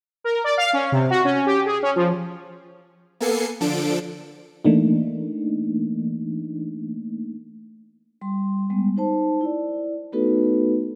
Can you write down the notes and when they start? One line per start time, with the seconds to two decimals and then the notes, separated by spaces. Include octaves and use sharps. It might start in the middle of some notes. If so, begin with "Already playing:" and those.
0.24 A#4
0.44 D5
0.57 F5
0.73 C#4
0.92 C3
1.10 F#4
1.25 C#4
1.46 G4
1.66 G#4
1.83 C#4
1.96 F3
3.20 A#3 B3 A4 G#5 C7 C#7
3.60 D3 F3 D4 A4 D7
4.65 E3 A3 A#3 D4 D#4
8.21 G3 C6
8.70 G3 G#3 B3
8.97 D#4 C5 A5
9.41 E4 D5
10.12 A3 B3 D#4 F#4 A4 B4